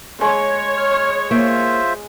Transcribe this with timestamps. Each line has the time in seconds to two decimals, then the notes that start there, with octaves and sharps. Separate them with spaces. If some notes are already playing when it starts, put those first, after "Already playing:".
0.21 G#3 C#5
0.78 F6
1.31 A#3 F4 C5 E5